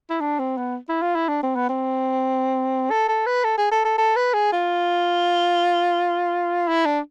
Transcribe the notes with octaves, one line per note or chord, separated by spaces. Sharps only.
E4
D4
C4
B3
E4
F4
E4
D4
C4
B3
C4
A4
A4
B4
A4
G#4
A4
A4
A4
B4
G#4
F4
E4
D4